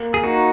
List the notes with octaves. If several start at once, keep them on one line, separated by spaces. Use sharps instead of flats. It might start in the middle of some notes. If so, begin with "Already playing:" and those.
Already playing: A#3
G#4
A#3 D#4 F#4